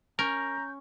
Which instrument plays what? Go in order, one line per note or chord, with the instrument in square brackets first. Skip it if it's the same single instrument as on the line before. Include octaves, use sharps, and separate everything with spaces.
[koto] C#4 [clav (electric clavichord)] A#4 [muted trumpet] A#5 [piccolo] G6